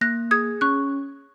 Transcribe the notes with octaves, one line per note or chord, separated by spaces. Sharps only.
A#3 F#6 A#6
G#4 D#6 G#6
C#4 C#6 F#6